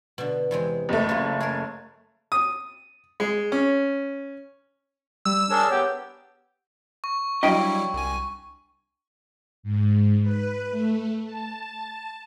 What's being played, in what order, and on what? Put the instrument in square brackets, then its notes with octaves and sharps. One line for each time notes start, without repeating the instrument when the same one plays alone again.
[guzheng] B2 D3
E2 C3 G#3
[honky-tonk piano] F#1 A3
[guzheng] C#3 F4
G#4 A#4
[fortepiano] D#6
G#3
C#4
[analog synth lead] G3 [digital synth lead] E6
[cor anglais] D4 [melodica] G#4 A#4 [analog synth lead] C#5
[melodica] B3 [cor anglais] G4
[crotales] C#6
[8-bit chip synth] F#3 G3 E4 [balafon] D4 F#4 [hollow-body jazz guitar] D#5 F5 G5
[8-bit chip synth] C2 G#5
[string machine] G#2
B4
A3
A5